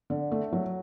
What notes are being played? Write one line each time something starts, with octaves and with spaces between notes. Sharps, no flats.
D3
A3
F#3